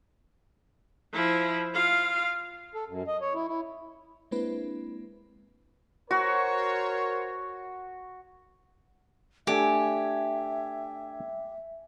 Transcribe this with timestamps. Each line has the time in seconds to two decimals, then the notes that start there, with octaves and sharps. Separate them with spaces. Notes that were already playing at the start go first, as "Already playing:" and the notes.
1.13 F3 E4
1.74 F4 F5
2.75 A4
2.87 F#2
3.07 D#5
3.21 C#5
3.34 E4
3.48 E4
4.31 G#3 A#3 C4 D4 E4 B4
6.11 F#4 A#4 C5 C#5
9.47 A3 D4 G4 A4 E5 G#5